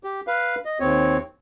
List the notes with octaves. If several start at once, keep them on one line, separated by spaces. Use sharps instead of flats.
G4
B4 F5
D#5
D#2 C4 C#5